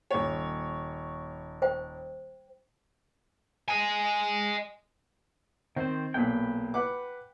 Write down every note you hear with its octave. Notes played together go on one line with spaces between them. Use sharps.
D#1 C#5
C5 G5
D#5 G#5
D#3 C4 C5
B1 A#2 G5 B5
B4 F#5 D6